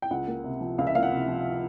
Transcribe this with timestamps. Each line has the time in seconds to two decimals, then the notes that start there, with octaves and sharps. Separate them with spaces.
0.02 G5
0.11 C#2 F#5
0.28 A#3
0.44 C3
0.61 F3
0.78 C#2 F5
0.87 E5
0.95 A#3 F5
1.03 F#5
1.12 C3
1.28 F3